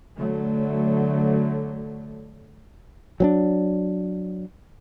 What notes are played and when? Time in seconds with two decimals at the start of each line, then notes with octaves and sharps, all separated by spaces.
0.18 D3 F#3 A3
3.20 F#3 C4 D4